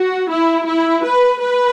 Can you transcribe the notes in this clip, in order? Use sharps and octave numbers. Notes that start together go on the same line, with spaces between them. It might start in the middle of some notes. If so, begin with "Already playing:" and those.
Already playing: F#4
E4
E4
B4
B4